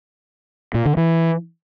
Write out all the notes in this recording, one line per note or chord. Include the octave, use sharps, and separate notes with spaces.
A#2
D3
E3